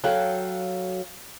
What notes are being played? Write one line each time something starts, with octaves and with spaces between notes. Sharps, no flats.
F#3 A4 F5 G5